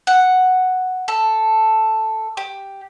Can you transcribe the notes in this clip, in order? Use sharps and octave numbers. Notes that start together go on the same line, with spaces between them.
F#5
A4
G4